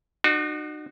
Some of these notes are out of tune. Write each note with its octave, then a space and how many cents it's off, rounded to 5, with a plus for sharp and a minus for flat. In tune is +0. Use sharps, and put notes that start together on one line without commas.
D#4 -45 F#4 +0